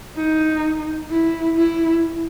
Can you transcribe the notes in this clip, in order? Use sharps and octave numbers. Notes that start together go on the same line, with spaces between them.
D#4
E4
E4